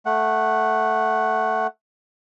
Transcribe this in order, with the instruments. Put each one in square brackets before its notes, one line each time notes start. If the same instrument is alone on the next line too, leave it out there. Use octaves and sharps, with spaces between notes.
[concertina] A3 F#5